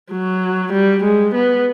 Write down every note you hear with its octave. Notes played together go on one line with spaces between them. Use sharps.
F#3
G3
G#3
B3